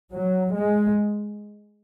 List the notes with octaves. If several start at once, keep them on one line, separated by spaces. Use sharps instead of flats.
F#3
G#3